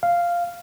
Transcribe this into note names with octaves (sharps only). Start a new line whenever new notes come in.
F5